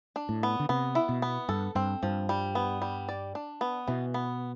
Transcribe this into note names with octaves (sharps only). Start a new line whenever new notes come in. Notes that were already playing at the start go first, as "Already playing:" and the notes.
D4
A2
B3
D3
C3 B3
E4
B2
B3
G2 A4
G2 C4
G2 F3
G3
B3
G3
D5
D4
B3
B2 E3
B3